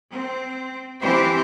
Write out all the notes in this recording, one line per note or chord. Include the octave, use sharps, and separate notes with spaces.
C4
E3 C4 G4 C5